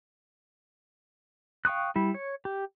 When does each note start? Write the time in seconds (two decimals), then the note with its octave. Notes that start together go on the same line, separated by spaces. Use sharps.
1.65 F5 G5 C#6 D#6 F#6
1.96 G3 E4
2.14 C#5
2.45 G4